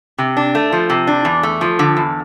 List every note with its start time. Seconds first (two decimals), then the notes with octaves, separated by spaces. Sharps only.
0.18 C3
0.37 D4
0.55 A3
0.72 F3
0.90 C3
1.07 D4
1.25 E2
1.43 A3
1.61 F3
1.79 D3
1.97 E2